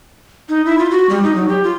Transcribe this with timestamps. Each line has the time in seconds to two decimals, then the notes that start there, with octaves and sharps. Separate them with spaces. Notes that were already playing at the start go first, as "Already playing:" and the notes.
0.49 D#4
0.66 E4
0.78 F4
0.91 F#4
1.09 G3
1.23 D#4
1.35 F#3
1.49 G4
1.64 F4